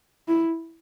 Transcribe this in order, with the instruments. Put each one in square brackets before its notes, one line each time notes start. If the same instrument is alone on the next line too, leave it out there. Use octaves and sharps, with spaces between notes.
[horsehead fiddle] E4